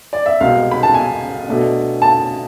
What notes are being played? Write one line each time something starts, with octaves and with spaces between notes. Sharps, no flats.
D5
E5
C2 B2 G#3 F5
B5
A5
G#5
B2 A3 D4
A5